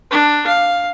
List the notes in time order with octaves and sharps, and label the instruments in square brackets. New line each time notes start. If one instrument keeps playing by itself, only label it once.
[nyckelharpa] D4
F5